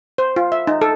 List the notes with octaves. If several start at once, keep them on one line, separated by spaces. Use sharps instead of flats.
C5
F4
E5
D#4
A4